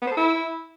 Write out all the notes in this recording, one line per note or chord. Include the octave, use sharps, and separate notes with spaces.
B3
C5
A4
E4